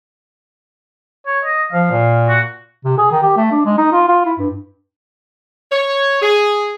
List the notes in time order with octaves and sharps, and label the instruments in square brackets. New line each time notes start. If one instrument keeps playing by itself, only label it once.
[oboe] C#5
D#5
[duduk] F3 [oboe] F5
[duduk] A#2
[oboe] F#4
[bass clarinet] C3
G#4
D#3
G4
A3
D4
G#3
D#4
F4
F4
E4
G2
[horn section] C#5
G#4